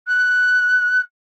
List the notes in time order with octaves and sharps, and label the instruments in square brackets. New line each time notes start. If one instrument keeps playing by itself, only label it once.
[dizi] F#6